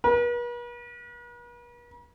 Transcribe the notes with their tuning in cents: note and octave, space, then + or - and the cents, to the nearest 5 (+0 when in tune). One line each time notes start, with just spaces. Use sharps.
B4 -45